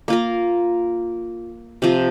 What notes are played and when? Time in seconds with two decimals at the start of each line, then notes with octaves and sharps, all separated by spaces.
0.08 A#3 F4 A#4
1.82 C3 F3 C4